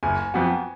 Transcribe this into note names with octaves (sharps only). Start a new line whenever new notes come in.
F#1 G#5
F2 F3 B3 F#4